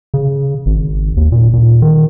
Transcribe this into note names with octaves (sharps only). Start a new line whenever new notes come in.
C#3
G#1
D#2
A#2
A#2
D#3